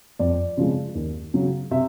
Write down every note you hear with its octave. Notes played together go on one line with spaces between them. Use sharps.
F2 D5
C#3 F3 G#3 C4
D#2
C#3 F#3
C3 E5